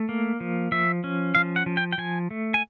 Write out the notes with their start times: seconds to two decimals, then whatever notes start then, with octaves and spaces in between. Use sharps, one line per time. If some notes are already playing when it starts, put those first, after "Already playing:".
Already playing: A3
0.09 A#3
0.40 F3
0.72 F3 E5
1.04 C#4
1.35 F3 F5
1.56 F#5
1.66 F3
1.77 G5
1.92 G5
1.98 F3 G#5
2.31 A3
2.54 G#5